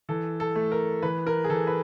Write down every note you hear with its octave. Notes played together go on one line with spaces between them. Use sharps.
E3 A4
A4
A3
A#4
E3 B4
A#4
G#4
E3 A4
B4